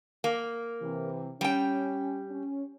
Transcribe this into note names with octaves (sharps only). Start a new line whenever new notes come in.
A#3
C3 E3
G3 C#4 G5
C#4